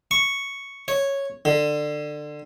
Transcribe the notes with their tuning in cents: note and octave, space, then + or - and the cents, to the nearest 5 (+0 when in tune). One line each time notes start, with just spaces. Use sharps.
C#6 +0
C#5 -5
D3 +20